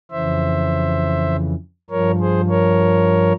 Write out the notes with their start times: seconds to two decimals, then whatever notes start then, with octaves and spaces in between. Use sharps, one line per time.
0.11 F2 C#3 E3 C5 E5
1.90 G2 F3 A#4 C#5
2.20 G#4 C5
2.49 A#4 C#5